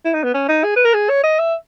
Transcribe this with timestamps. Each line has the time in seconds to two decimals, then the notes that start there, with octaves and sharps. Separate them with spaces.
0.05 E4
0.14 D#4
0.24 B3
0.34 C#4
0.49 D#4
0.64 G#4
0.76 B4
0.85 A#4
0.94 G#4
1.10 C#5
1.24 D#5
1.39 E5